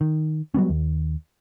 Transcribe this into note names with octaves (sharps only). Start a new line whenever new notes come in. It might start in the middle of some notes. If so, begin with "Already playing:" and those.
D#3
F#3 G3 B3 C#4
D#2